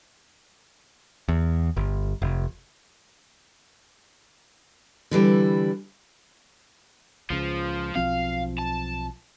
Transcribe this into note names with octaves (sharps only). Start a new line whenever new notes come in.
E2
G1
F1
D3 E3 G3 E4
C#2 C#3 F3
B1 F3 C4 F5
A5